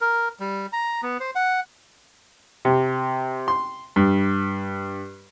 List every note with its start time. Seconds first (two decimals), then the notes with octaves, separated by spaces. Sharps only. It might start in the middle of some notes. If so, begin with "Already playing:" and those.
0.01 A#4
0.40 G3
0.73 A#5
1.03 B3
1.20 C5
1.35 F#5
2.65 C3
3.48 C6
3.96 G2